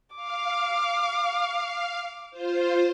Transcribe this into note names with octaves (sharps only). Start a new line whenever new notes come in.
F5 D6
F4 C5